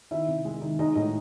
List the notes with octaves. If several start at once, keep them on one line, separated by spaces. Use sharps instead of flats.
D#3 E4 E5
C3
G#3
D#3
G#3 D#4 D#5
A2 D#4 D#5